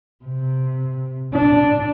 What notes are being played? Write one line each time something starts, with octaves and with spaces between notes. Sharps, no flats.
C3
D4